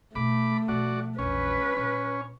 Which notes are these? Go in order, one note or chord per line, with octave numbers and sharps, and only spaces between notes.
B2 A3 E4 B5 D6
B2 F3 F#4 D5
A#1 E2 C#4 B4
A#2 A#3 C#4